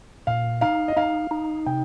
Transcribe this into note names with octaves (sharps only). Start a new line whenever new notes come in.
A#2 F5
D#4 F5
D#5
D#4 F5
D#4
C3 G5